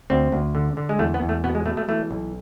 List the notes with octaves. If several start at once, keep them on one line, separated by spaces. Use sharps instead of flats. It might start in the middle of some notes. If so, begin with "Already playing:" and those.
D2 C4
D2
D3
D3
G#3
E2 A3
B3
E2
A3
B2 B3
G#3
B2 A3
A3
E3 A3
B1